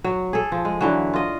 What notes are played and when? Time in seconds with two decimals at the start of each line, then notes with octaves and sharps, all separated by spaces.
0.04 F#3
0.33 G#4 A4
0.52 F3
0.65 G#3
0.81 D3 E3 F#3
1.14 F4 D#5